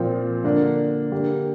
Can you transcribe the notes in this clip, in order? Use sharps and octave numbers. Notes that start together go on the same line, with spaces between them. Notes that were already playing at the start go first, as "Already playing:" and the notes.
Already playing: A#2 F3 C4
D3 A#3 D4
D3 A#3 G4